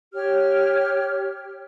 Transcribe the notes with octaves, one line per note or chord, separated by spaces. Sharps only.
G4 C#5 F6